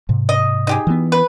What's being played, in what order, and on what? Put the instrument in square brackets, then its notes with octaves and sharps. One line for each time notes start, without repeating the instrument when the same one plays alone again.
[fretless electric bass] G#2 C3
[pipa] D#5
D#4 G4 G#4
[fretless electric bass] E3 B3
[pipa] B4